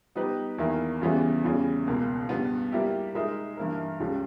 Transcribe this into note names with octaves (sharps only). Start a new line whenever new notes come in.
G3 B3 D#4 G4 B4
E2 D#3 A#3 E4
E2 C#3 E3 G3 B3
E2 C#3 G3
C#2 B2 A#3
G2 G3 B3
G3 A#3 E4 G4
G#3 D#4 A#4 E5
G2 E3 A#3 E4 A#4
C#2 C#3 G3